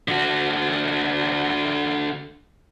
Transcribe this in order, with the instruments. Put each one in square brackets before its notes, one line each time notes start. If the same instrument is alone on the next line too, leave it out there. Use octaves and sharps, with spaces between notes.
[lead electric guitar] D3 F#4